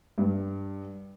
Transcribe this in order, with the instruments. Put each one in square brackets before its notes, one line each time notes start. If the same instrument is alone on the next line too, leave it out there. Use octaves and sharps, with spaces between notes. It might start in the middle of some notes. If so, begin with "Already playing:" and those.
[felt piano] G2